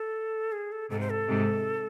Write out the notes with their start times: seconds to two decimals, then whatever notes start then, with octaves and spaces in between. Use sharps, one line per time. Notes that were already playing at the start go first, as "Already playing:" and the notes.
Already playing: A4
0.52 G#4
0.72 A4
0.90 G#2 C3 A4
1.00 C5
1.11 A4
1.28 G#2 C3